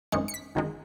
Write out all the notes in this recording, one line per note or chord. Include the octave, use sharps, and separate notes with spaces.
G#1 F#2 D#3 G#3 C#7
C#7
B6
G#1 F#2 D#3 G#3